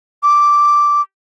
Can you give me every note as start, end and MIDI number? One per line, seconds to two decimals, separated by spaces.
0.23 1.02 86